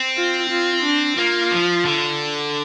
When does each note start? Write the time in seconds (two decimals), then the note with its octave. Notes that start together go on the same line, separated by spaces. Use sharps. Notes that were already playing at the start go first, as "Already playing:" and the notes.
Already playing: C4
0.17 F4
0.50 F4
0.83 D4
1.17 A#3 F4
1.51 F3
1.85 D3